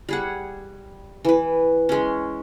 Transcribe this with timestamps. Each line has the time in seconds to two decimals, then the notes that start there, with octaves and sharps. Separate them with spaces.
0.09 G3 G#4 F#5
1.25 E3 B4
1.89 G#3 C#4